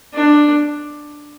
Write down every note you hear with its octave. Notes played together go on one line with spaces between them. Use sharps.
D4